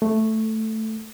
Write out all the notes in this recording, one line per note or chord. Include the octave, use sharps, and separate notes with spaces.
A3